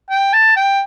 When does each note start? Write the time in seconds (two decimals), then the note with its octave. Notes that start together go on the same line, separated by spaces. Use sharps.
0.10 G5
0.33 A5
0.56 G5